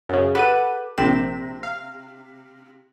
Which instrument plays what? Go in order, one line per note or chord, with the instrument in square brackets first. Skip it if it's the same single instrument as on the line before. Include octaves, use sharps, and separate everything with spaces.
[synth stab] F#2 C#3
[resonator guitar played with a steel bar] G4 A4 F#5 [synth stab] B4 D#7
[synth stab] A#1 C4 E7 [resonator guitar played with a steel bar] C3
[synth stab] F5